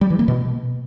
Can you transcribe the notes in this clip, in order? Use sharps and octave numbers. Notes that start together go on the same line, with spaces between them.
G3
E3
A#3
B2